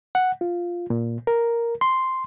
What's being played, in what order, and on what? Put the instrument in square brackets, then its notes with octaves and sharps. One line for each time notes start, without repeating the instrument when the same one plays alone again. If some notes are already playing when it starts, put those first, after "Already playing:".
[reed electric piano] F#5
F4
A#2
A#4
C6